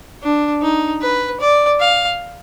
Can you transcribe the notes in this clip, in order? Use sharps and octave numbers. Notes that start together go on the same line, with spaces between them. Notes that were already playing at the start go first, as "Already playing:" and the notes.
D4
D#4
B4
D5
F5